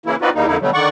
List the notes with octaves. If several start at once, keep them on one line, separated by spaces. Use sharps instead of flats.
C#3 E3 A#3 E4
C4 D#4 F4 F#4 B4 D5
E2 D#3 G3 A#3 D#4
F2 D3 A#3 D#4 E4
B2 D3 F#3 G3 A3
D3 D#3 D5 F#5 C#6